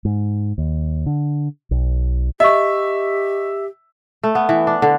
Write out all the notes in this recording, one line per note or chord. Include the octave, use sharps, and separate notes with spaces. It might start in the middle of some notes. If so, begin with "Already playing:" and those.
G#2
D#2
D3
B1
G4 D#5 E5 C#6
A3
B3
E3
D4
D3